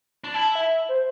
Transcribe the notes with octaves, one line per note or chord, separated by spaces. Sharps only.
D4
E4 A5
E5
C5